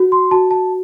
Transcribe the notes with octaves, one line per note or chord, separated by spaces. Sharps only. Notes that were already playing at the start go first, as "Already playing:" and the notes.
Already playing: F#4
C6
F#4 A5
A5